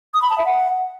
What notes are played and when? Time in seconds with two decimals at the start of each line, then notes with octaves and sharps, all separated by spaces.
0.14 D#6
0.22 B5
0.30 A5
0.38 E5
0.46 F#5